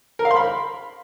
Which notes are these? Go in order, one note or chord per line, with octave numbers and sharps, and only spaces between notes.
A#4
F5
C6
B5